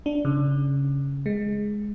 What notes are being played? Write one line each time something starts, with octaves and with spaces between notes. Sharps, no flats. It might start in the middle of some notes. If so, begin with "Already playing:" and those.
D4
C#3
G#3